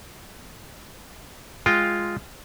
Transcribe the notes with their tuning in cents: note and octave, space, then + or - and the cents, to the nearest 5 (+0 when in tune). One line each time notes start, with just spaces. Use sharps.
G#3 +0 F4 +0 G5 +0